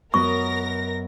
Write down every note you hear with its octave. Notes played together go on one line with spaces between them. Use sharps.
F#2 B3 A#4 D#5 C#6 A#6